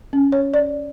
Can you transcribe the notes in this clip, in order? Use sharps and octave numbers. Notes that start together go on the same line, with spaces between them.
C#4
C#5
D5